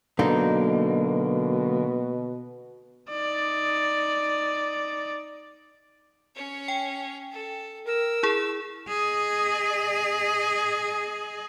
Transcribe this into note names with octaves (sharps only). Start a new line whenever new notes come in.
B2 D3 F#3 A#3 D#4
D#4 D5
C#4 C#5
G5
A4
A#4 E6
E4 G#4
G#4 D#5